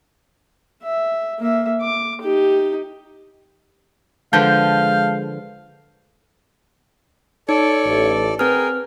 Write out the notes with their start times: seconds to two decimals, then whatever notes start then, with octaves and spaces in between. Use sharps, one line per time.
0.83 E5
1.39 A#3 E5
1.82 D6
2.21 D#4 G4
4.33 D3 F3 G#3 B4 F5 A5 G6
7.49 D#4 A4 C#5 D5
7.85 A1
8.39 C4 G#4 A#4 B4 G5 F6